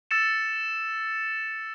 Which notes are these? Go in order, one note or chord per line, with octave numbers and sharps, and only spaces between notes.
E6 A6 C#7 E7